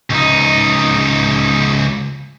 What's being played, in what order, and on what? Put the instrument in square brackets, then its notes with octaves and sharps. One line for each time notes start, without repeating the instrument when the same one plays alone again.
[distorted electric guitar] C#2 D#4